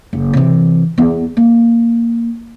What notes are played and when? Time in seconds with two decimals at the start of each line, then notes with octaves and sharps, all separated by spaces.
0.13 F#1
0.33 C3 E3
0.98 E2 B3
1.37 A#3